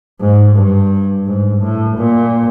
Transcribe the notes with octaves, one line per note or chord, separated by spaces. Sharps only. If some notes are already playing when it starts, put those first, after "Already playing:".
G#2
G2
G#2
A2
A#2